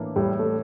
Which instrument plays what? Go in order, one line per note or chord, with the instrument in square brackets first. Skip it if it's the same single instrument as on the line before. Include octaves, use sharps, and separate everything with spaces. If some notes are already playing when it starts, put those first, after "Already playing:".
Already playing: [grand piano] A2 E3 A#3 D4
[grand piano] A2 [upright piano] G3
[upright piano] A3